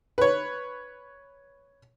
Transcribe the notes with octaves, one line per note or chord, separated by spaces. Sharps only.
B4 C#5